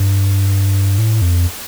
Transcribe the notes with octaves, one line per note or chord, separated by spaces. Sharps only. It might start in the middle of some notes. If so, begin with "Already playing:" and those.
Already playing: G2
A2
F2